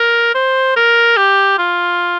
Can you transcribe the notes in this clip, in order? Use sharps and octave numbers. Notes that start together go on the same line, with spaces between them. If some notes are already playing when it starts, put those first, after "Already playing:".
Already playing: A#4
C5
A#4
G4
F4